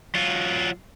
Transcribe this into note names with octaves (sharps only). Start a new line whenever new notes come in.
F#3 F4